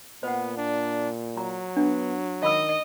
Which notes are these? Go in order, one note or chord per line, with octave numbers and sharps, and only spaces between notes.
A#2 B3 C5 F#5
D4
F#3 A#5
B3 D4
D#3 D#5 F5 B5 E6